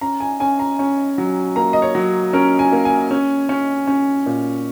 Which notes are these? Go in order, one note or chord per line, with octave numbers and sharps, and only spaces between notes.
C#4 A#5
G#5
C#4 G#5
A#5
C#4
F#3
A#3 A#5
D#5
C#5
F#3
C#4 A#4
G#5
A#3
G#5
C#4
C#4
C#4
A#2